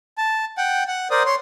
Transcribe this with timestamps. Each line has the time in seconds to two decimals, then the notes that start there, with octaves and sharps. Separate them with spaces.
0.18 A5
0.58 F#5 G5
0.88 F#5
1.11 A#4 C5 D5 D#6
1.26 C#5 C6